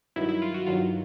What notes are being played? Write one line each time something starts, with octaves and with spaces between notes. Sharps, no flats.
G2 D#3 F#3 E4
E4
F4
F#4
G2 D#3 F#3 F4